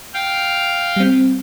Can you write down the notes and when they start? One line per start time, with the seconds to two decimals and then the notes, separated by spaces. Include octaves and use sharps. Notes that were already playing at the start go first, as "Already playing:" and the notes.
0.14 F5 G5
0.96 G3 C4